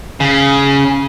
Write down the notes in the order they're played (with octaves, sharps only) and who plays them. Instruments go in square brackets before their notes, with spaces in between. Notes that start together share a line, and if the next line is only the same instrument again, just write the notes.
[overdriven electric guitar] C#3